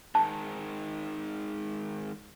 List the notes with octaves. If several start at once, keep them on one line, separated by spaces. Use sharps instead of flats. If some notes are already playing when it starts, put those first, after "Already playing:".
G#2 D#3 A5